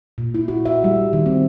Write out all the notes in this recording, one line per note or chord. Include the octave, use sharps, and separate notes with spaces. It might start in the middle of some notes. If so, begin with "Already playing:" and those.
A#2
E4
F#4
E5
G3
D#3
C4